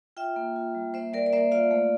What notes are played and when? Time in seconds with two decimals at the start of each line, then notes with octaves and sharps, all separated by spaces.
0.17 F4 E5 G5
0.36 A#3
0.56 F4
0.75 G3
0.94 A#3 C5 E5
1.13 G3 A#4 D5
1.26 D5
1.33 A#3 C5 E5
1.52 F4 D5 F5
1.71 A3